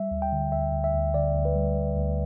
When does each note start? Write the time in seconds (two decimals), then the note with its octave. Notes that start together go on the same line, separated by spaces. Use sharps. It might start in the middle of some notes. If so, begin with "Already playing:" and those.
Already playing: G3 E5
0.11 D2
0.22 G5
0.32 D3
0.52 D2 E5
0.73 D2
0.84 E5
0.94 D2
1.14 D3 D5
1.35 D2
1.45 B4
1.56 G3
1.76 D2
1.97 D2